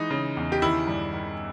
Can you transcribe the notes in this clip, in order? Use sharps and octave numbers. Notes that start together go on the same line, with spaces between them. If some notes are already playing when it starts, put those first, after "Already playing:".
Already playing: E3 G#3 D#4
C#3
E2
G4
D#3 E4
G2
D#3